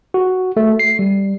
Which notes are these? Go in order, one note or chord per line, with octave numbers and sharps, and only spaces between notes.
F#4
A3
C7
G3